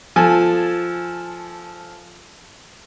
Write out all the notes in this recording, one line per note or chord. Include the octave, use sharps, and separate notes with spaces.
F3 A4 G#5